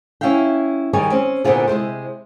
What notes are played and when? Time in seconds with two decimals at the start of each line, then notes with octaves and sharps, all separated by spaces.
0.21 C#4 D4 E4 E5 F5 G5
0.93 D#3 G3 G#4 C#5 G#5
1.11 C4 C#4
1.44 A#2 D3 B3 C4 F4 G#4
1.68 C3 G#3 E4 C5